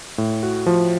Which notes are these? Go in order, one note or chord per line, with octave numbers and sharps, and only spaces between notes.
A2
F#4
F3